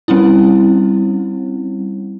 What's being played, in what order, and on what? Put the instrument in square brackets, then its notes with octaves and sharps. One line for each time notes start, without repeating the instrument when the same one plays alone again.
[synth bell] G3 C4 C#4 E4